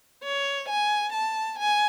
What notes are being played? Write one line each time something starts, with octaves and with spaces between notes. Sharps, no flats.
C#5
G#5
A5
G#5